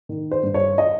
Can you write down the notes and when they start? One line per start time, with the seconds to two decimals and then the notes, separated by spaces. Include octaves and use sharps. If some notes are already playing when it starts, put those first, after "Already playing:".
0.09 D#3
0.31 C5
0.43 G2
0.54 C#5
0.78 D#5